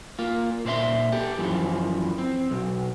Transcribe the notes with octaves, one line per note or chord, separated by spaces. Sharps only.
A#3 F4
A#2 C5 D5 E5 C6
G4 A4
F#2 E3 F3
C4
B1